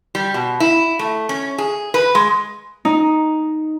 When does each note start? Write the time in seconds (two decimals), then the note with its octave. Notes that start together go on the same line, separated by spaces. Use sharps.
0.15 G3
0.34 B2
0.60 E4
0.99 A3
1.29 C#4
1.58 G#4
1.94 B4
2.15 G#3
2.85 D#4